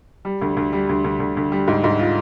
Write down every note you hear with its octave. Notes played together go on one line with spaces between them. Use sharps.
G3
D2
D2
G3
D2
D2
D2
D2
G3
G#2
G#2
F4